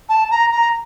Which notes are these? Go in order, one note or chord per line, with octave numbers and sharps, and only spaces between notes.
A5
A#5
A#5